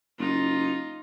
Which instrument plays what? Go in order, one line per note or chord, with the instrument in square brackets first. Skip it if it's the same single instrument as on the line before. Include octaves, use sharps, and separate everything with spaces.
[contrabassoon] F#1 [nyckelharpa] D#4 F4